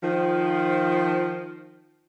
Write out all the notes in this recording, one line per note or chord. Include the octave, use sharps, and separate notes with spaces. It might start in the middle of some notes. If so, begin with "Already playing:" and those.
D#3 F3